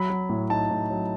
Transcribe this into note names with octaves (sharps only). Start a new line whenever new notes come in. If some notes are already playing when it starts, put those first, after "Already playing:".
Already playing: F#3 B5
F#3
A2
D#4 A5
A2
F#3